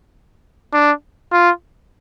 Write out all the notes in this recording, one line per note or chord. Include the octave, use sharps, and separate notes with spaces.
D4
F4